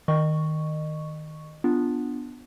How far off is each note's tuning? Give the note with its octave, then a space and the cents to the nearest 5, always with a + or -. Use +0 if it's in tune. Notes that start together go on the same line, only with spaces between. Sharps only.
D#3 +0 D#5 -30 C#6 +0
B3 +0 D4 +0 F4 +0